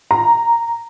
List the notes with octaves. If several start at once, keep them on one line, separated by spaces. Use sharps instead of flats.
A#5